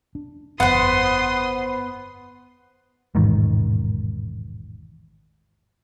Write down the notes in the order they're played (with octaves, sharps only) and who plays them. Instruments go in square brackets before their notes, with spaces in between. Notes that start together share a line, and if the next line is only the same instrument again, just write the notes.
[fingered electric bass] D4
[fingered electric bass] G1 F2 [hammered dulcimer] B3 [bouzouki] C5 F#5 [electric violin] C6 D#6
[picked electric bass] E1 A1 G#2 D#3